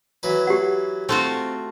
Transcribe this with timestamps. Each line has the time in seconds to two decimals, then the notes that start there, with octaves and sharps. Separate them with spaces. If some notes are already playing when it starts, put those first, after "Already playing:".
0.23 E3 F#3 B4
0.47 G4 F#5
1.09 A3 C4 F4 F#4